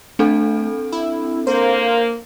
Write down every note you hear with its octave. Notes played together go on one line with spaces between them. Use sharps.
A3 C4 D4 A4
E4
A#3 C5